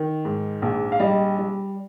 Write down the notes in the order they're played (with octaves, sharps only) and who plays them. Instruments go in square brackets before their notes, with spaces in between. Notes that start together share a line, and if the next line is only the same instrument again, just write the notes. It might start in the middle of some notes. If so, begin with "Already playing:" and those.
Already playing: [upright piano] D#3
G#2
A#1
F5
G3 D#5
G3